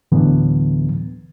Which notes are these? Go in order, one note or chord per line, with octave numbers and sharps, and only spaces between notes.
D2 A2 D3 E3 F#3 B3